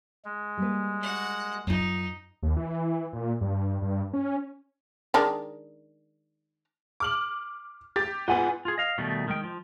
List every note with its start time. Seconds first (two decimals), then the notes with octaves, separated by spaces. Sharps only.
0.25 G#3
0.57 G3 A#3 B4
1.01 F#4 F#5
1.67 F#2 D#4 F4
2.43 D#2
2.57 E3
3.13 A#2
3.41 G2
3.82 G2
4.13 C#4
5.14 D#3 G#3 D4
7.00 D6 F6 F#7
7.96 G4 A6
8.28 G#2 B3 F4 F#5 G#5
8.65 F4 G#4
8.78 D#5 F5
8.98 B2 D#3 G3 A3
9.28 D#3 G#3 G5
9.44 F3